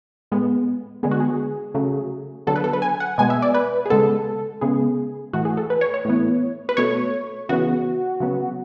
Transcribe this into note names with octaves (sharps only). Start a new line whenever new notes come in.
A2 G#3 B3
D3 G#3 B3 G#4
F#4
G#4
C#3 F#3 A3
D3 F#3 B3 A4
B4
A4
B4
G#5
F#5
B2 G#3 B3 G#5
E5
D5
B4
G#4
C#3 G#3 B3 A4
C#3 G#3 B3 G#4
A2 E3 A3 F#4
G#4
A4
B4
C#5
C#5
A2 E3 B3
B4
B2 A3 C#5
C#3 E3 B3 F#4
C#3 F#3 B3